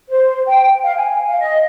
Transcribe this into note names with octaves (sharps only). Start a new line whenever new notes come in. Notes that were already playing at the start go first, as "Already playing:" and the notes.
C5
G5
F5
G#5
F5
D#5